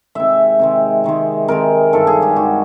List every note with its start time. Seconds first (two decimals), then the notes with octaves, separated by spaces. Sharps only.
0.15 C3 D#3 G#3 E5
0.59 C3 D#3 G#3
1.04 C3 D#3 G#3
1.48 C3 D#3 G#3 A#4
1.93 G2 D#3 G#3 A4
2.07 G#4
2.22 G4
2.36 G2 D#3 G#3 F#4